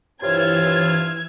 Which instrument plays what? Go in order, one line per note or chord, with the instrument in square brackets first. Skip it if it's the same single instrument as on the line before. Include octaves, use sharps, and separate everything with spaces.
[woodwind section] G2 C3 F4 [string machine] E3 E6 F6 [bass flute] C#5 [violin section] G#6